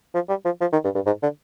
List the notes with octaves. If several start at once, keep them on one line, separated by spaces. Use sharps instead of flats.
F3
G3
F3
F3
D#3
G2
G2
G#2
D3